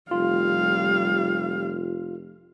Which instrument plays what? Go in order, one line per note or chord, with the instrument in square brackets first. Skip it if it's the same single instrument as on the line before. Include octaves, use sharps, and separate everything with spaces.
[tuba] F1 [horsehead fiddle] G3 F5 [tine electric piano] F4